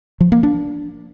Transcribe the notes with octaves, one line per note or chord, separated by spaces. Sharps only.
F3
A#3
D4